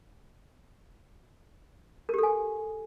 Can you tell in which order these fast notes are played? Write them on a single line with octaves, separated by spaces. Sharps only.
A#4 G4 A4 G#5